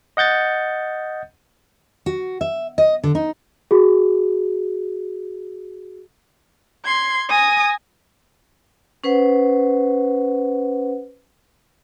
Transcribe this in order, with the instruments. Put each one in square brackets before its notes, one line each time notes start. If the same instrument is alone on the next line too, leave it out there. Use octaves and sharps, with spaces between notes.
[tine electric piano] D#5 F#5 G6 A6 C#7
[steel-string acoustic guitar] F#4
E5
D#5
D3
D#4
[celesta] F#4 G#4
[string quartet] C6 G#6
G#5 D#6 A#6
[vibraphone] C#4 B4 C5 F#5